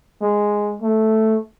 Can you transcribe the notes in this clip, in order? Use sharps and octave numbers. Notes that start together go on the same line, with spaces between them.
G#3
A3